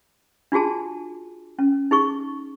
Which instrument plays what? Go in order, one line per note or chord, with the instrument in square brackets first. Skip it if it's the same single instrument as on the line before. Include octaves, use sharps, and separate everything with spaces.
[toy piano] D4 F4 F#4 G#4 A5
C#4
D#4 G#4 C#6